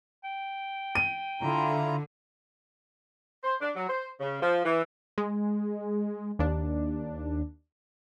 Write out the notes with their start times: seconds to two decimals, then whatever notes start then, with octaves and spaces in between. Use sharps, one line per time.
0.24 G5
0.95 D#7
1.42 D3 E4 F4 A#5
3.43 C5
3.60 D4
3.75 F#3
3.88 C5
4.20 C#3
4.41 F3
4.64 E3
5.18 G#3
6.39 D#2 D4